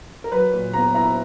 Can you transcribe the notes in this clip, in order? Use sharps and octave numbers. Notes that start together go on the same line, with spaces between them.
A#4
F#3 B4
A#2
B3 A#5
E4 A#5